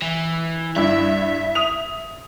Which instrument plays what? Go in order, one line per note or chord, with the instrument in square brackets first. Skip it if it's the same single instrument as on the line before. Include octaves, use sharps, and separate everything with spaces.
[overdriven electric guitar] E3
[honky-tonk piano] G2 E4 [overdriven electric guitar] E5
[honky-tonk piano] D#6 F7